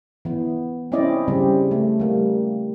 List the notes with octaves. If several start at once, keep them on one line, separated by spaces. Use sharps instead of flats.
E3 B3
C4 C#4 E4 D5 D#5
C#3 G3 C4
A3
G3 A#3